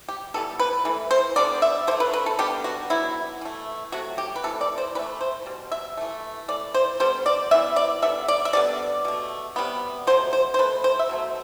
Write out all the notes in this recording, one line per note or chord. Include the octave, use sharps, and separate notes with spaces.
G4
E3 G3 B3 A4
B4
E3 A3
C5
D3 G3 B3 D5
E5
D3 A3 C5
B4
B4
A4
D3 G3 B3 G4
F#4
D3 F#3 B3 E4
E3 A3
C3 F#3 A3 F#4
G4
B4
C3 E3 A3 A4
D5
C5
E3 A3 B4
C5
B2 G3
E5
E3 A3
E3 A3 D5
C5
D3 G3 B3 C5
D5
E3 B3 E5
D5
D3 G3 B3 E5
D5
E5
D3 G3 B3 D5
B2 A3
C3 G3 B3
B2 F#3 A3 C5
C5
C5
B2 A3 B4
C5
E5
B2 F#3 A3